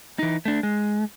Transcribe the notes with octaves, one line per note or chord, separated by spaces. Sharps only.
E3 D#4
A3 D4
G#3